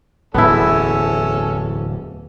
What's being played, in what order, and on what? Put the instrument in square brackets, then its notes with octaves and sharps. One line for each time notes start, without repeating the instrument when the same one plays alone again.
[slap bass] D1 E2 [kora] B3 E4 [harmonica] C#4 A4